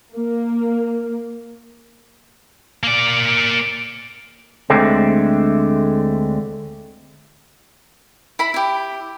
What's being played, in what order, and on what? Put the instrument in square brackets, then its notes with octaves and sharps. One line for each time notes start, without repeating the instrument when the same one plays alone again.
[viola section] A#3
[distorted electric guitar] A#3 D5
[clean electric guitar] D2 D3 G#3 A3 C4
[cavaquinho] E4 B5
E4 G4